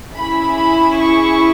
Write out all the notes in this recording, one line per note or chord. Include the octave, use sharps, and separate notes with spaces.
C#4 E4 G#4 B5
B5
C#6